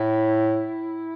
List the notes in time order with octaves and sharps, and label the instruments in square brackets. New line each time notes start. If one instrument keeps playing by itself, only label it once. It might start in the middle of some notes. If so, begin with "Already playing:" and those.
Already playing: [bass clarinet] A2 [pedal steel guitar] E4